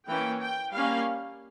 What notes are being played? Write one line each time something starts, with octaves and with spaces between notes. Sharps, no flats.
E3 A#3 C#4 G5
G5
G3 A#3 C#4 F5